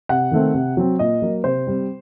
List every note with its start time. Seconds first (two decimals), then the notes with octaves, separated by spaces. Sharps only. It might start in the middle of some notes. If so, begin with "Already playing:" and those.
0.09 C3 F#5
0.31 D#3 A3 C4
0.54 C3
0.77 F#3 C4
0.99 A#2 D#5
1.22 F#3 A#3
1.44 C3 C5
1.67 G3 C4